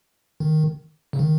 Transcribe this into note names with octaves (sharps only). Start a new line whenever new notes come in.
D#3
C#3
D#3